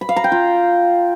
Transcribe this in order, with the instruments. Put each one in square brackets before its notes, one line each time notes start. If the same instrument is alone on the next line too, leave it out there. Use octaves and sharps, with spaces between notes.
[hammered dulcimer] B5
F5
A#5
G5
F4